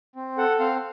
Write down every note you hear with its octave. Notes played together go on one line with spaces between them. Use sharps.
C4
A4 F#5
C4 F5